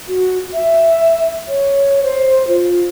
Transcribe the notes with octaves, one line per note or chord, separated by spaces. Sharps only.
F#4
E5
C#5
C5
F4